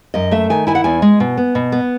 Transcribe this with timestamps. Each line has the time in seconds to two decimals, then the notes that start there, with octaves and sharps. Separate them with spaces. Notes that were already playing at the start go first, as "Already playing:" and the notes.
0.14 F#2 D#5
0.31 A3 E5
0.50 D#3 G#5
0.67 E4 G#5
0.75 F#5
0.84 E2 G#5
1.02 G#3
1.20 B2
1.37 B3
1.55 B2
1.72 B3